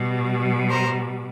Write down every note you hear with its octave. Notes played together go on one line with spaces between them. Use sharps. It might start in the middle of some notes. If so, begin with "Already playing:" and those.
Already playing: B2 G3
A#4 C5